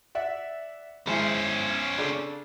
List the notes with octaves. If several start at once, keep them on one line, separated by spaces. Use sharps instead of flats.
D5 E5 F#5
G#1 G#3 C#4 E4 C5
C#3 D4 A4